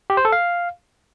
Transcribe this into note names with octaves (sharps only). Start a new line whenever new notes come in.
G4
C5
A4
F5